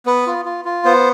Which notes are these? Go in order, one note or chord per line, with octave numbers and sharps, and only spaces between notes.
B3 B4
F4
F4
F4
B3 C5